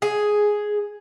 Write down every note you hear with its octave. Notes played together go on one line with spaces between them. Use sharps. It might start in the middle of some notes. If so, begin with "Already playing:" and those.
G#4